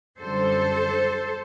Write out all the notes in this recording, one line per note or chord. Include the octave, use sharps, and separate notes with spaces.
F#2 D3 G3 A4 C5